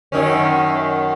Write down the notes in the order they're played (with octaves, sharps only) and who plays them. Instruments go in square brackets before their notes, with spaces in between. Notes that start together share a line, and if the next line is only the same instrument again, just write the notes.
[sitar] F#2 D#3 C#4